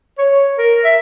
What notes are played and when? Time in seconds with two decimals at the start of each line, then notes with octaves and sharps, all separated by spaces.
0.19 C#5
0.58 A#4
0.84 E5